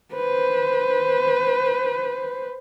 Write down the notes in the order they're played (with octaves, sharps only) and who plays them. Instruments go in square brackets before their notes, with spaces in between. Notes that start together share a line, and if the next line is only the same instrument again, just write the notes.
[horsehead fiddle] B4 C5